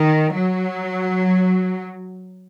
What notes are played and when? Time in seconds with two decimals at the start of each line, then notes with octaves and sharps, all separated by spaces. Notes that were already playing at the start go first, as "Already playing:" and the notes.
Already playing: D#3
0.34 F#3